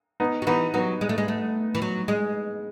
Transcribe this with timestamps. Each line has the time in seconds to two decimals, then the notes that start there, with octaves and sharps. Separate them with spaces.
0.20 B3 D#4
0.42 F#3
0.47 E3 B3 D#4
0.74 F#3 B3 D#4
1.01 G#3
1.09 A3
1.18 G#3
1.28 A3
1.75 E3
1.82 F#3
2.08 G#3